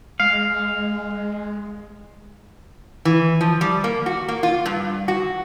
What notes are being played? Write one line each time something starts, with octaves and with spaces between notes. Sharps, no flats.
G#3 F5
E3
F3
G3
A#3
F#4
A#3
F4
G2
F#4